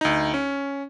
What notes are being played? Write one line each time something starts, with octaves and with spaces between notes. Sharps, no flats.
D2 D#4
C#4